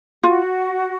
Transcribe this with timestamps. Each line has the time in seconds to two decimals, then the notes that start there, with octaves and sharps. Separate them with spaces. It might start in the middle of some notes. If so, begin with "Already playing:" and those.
0.23 F4 F#4